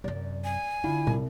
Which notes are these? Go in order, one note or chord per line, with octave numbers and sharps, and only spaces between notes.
F#2 C3 D5
G#5
D3 D4 E4 F4
C2 G3